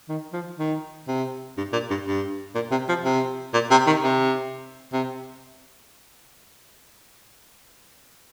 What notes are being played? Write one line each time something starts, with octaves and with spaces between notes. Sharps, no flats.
D#3
F3
D#3
C3
G2
A#2
G2
G2
A#2
C3
F3
C3
A#2
C3
D#3
C3
C3